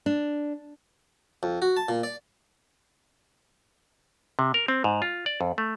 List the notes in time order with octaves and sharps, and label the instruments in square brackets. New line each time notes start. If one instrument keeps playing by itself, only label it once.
[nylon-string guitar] D4
[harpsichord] F2
F#4
A5
A#2
D5
[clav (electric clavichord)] C3
A#4
C4
G#2
F4
D5
F2
A3